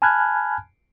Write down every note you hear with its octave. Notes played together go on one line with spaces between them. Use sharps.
G#5 A5 B5 F6 F#6 G#6